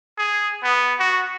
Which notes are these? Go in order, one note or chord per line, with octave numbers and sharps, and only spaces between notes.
G#4
B3
F#4